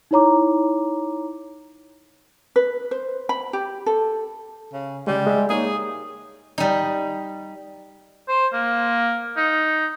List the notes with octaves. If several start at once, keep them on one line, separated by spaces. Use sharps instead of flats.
D#4 E4 C#5 A#5 D6
B4
C5
B5
G4
A4
C#3
C#3 G3 G#3
G#3 E5
A#3 D#4 G#4 C#5
G3 D#4
C5
A#3
D#4